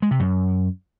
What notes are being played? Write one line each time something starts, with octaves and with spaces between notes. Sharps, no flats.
G#3
C3
F#2